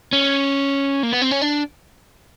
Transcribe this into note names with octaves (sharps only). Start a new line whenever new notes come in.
C#4
A#3
B3
C4
C#4
D4